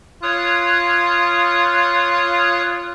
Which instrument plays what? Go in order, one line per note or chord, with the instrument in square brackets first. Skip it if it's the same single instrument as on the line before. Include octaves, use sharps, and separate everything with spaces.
[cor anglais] F4 [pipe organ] C#5 D#6 F#6